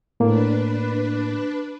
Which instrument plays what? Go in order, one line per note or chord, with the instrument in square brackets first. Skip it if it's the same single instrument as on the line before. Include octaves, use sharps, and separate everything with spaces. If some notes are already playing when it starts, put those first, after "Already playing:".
[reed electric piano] A2 A#3 [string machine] D4 B4